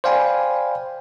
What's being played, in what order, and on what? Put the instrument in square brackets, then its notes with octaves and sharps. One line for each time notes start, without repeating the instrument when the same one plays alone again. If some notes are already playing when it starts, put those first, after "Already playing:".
[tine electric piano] C5 D5 F5 G5 G#5 B5